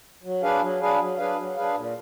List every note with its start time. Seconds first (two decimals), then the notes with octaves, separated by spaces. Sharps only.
0.23 F#3
0.42 D4 G#4 B4 F5
0.61 F#3
0.80 D4 G#4 B4 F5
0.99 F#3
1.17 D4 G#4 B4 F5
1.37 F#3
1.56 D4 G#4 B4 F5
1.75 A#2